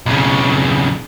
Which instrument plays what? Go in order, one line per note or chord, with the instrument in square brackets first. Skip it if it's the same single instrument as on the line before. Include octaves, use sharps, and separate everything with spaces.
[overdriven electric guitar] B1 C#3